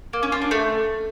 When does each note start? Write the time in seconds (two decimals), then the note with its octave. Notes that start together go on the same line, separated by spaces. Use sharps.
0.13 A#3
0.23 C#4
0.32 F4
0.42 D4
0.51 A3